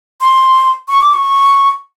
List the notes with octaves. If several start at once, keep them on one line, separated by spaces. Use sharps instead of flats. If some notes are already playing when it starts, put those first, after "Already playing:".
C6
C#6
D6
C#6